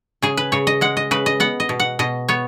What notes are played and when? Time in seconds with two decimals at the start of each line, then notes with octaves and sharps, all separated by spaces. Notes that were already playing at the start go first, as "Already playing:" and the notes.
0.22 C#3 G#4
0.37 B4
0.52 C#3 C#5
0.67 D#5
0.81 G#3 F#5
0.97 D#5
1.11 C#3 B4
1.26 D#5
1.40 B3 F#5
1.60 D#5
1.69 B2
1.80 F#5
1.99 B2 D#5
2.28 B3 C#5